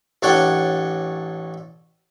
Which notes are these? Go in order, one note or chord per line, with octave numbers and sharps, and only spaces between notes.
A1 D4 C#5 F#5 G5